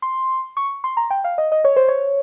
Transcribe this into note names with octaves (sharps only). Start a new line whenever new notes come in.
C6
C#6
C6
A#5
G5
F5
D#5
D#5
C#5
C5
C#5